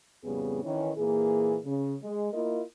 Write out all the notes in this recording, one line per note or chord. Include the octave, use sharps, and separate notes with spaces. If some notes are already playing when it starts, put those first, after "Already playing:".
F2 A2 C#3 G3 B3 G#4
D#3 E3 C#4
A#2 E3 A#3 G#4
C#3
G#3
A#3 E4 F4 A#4 D#5